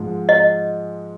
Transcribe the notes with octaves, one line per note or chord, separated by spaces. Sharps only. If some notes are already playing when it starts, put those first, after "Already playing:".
Already playing: G#2 F3 G#3
D#5